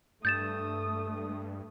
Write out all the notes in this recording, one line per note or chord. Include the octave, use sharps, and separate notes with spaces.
G2 A3 D#6 G6 A6 E7